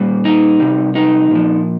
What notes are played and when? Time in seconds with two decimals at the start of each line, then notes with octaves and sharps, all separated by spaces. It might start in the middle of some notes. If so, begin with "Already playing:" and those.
Already playing: A#2 G3
0.25 D#4
0.60 C3 G3
0.95 D#4
1.31 A#2 F3